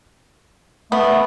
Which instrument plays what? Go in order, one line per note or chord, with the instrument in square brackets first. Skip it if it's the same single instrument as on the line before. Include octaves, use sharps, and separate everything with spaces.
[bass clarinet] A3 [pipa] B3